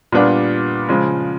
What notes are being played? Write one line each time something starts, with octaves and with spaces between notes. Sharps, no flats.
A#2 G3 B3 D4 F4
C#3 F3 G#3